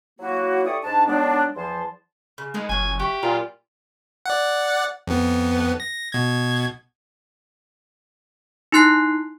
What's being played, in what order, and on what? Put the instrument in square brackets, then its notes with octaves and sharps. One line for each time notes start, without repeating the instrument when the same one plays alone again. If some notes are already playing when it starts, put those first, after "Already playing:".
[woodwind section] F#3 A#3 E4 F#4
E4 G4 A4 D5 C#6 D#6
G#2 D4 A5
D#3 F#3 G#3 B3 D4
E2 F3 A5 C6
[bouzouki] C#3
[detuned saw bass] G#3 [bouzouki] D#4 A#4 B4
[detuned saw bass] F#1 [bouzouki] A#2 F#3 [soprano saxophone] G#5
[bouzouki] F#4 E5 [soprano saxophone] G4
[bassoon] A#2 [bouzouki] F#3 E4 A#5 [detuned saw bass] F4
[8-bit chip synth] D5 F#5
F2 B3
A#6
B2 G#6
[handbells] D#4 E4 C6 F#6 C7